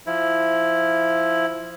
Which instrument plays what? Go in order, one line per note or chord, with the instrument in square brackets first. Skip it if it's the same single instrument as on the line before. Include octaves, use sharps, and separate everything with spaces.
[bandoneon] F3 E4